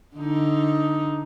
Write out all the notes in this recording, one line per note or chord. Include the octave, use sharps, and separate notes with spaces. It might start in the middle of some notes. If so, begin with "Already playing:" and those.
D3 D#4